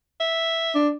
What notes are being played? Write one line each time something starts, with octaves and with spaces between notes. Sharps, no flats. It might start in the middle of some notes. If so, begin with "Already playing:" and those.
E5
D4